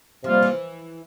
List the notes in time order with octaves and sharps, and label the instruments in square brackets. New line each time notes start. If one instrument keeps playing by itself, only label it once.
[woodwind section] C3 G3 A#3 F4 [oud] F3
[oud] E3